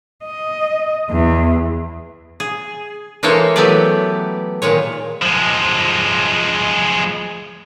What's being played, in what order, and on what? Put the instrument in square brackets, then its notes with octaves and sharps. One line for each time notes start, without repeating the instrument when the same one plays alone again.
[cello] D#5
E2
[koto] G#4
E3 G#3 A#3 A4 C5 C#5
E3 F#3 A3 B3 G4 D5
A#2 D#3 G#3 C#5
[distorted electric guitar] F3 G#3